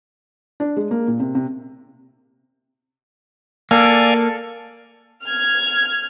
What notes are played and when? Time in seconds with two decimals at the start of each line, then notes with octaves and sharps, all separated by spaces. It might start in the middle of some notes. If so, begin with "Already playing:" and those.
0.60 D4
0.77 G#3
0.91 A#3
1.08 A#2
1.20 C3
1.35 C3
3.71 A#3 A4 D5 F5 G#5
5.25 F6 G#6